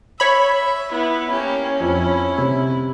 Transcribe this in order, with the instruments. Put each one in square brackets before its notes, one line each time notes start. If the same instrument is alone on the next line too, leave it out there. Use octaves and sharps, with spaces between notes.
[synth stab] C#5 B5 [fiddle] E5
[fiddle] B3 [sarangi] E4
[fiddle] A#3 G4 [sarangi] C#4
[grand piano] F2 [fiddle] E4
[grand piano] C3